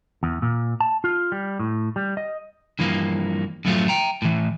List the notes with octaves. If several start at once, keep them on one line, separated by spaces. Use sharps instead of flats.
E2
A#2
A5
F4
G3
A2
G3
D#5
G2 E3 F3 A#3
F#2 A2 F3 F#3 A3 F4
G5 A#5
A2 E3